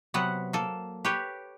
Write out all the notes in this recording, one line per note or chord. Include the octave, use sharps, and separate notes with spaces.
C3 F#3 B3 B4 F#5
A#3 A4
G4 B4 C#5